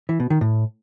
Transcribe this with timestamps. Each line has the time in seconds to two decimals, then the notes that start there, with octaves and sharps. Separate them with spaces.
0.09 E3
0.20 B2
0.30 D#3
0.41 A2